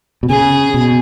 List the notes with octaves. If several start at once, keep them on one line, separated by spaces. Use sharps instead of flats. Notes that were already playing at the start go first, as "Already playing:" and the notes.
B2
C#3 G#4
B2